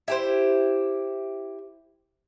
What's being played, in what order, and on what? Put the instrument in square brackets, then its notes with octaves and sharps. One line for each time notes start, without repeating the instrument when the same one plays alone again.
[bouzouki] E4 G4 C5